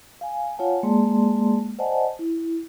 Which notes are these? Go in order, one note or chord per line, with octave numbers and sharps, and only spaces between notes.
F5 G#5
F4 C#5 F5 F#5 G#5 A5
G#3 A#3 G#4 D5 A5 C6
C5 D5 D#5 F#5 G#5 A5
E4